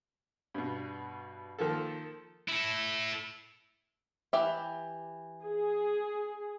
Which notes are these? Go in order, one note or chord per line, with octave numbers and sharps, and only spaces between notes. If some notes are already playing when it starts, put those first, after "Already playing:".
G2 B2
D#3 F3 A#3 A4
E4 A4
E3 G4 E5
G#4